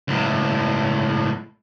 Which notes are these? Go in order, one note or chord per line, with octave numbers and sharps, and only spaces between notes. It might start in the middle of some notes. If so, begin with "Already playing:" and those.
C#2 A2